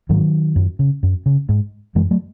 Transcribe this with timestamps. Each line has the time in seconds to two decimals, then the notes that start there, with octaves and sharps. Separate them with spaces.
0.09 G#2 D#3 F#3
0.56 F#2
0.79 C#3
1.03 F#2
1.26 C#3
1.49 G#2
1.95 F#2 E3 G#3
2.11 F#3 A3